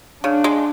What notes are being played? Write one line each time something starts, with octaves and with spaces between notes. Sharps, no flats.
C#3 D4
G#3